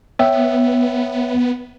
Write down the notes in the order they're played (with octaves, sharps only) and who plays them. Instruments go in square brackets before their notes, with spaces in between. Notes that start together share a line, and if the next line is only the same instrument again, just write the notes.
[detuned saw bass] B3 [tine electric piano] C#5 E5 G5